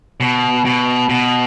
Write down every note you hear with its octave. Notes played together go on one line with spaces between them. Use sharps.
B2
B2
B2